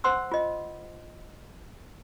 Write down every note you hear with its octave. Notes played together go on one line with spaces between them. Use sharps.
C5 F#5 C6 E6
F4 D#5